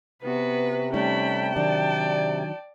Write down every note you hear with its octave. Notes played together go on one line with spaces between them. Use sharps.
C3 B3 F#4 B4
G3 A3 C#4 D#4 G5 A5 B5
D#3 F#3 D4 D5